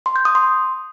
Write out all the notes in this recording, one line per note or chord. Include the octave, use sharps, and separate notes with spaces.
C6
G6
D#6
C6